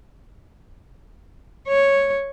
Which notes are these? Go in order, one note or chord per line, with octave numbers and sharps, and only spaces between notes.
C#5